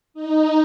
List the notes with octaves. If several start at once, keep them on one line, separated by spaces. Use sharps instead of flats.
D#4